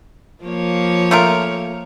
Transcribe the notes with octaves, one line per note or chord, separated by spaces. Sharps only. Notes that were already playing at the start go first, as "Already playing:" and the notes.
F3 A#3 C#5
A3 F4 A#4